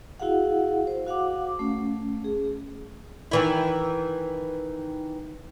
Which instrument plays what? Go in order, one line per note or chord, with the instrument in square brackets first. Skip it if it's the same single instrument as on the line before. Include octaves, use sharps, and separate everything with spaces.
[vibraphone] E4 F#4 G#4 F5 F#5
C5
F#4 F5 F#5 D6
A3 C#4
G#4
[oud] D#3 E3 E4